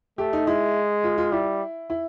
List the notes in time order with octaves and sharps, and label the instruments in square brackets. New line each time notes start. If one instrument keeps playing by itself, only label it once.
[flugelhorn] A3 [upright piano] G4
[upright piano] D#4
[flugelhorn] G#3 [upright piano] E4
[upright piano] F4
F4
[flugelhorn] G3 [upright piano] E4
[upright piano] E4